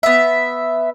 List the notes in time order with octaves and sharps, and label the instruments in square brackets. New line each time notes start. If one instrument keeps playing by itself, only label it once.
[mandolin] B3 E5